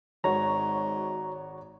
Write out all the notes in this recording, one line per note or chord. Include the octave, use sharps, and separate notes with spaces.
G#1 G#2 F#4 C#5 A#5